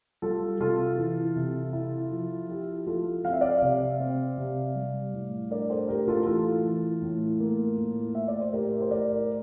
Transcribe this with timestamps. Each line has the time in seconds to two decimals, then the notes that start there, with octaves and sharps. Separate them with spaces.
0.22 G3 F4 A4
0.60 C3 F4 A4
0.98 E3
1.36 C3
1.73 E4
2.11 F3
2.49 E4 G4
2.87 F3 F4 A4
3.24 C4 F5
3.33 E5
3.41 D5 F5
3.62 C3
4.00 C4
4.38 C3
4.75 G3
5.13 A2
5.50 D4 A#4 D5
5.70 A4 C5
5.88 A2 G4 A#4
6.08 F4 A4
6.26 E3 F4 A4
6.65 E3
7.02 A2
7.40 A#3
7.77 A2
8.15 A3 E5
8.28 D5
8.40 C5
8.52 A2 G4 A#4
8.81 C5
8.90 A2 A#4 D5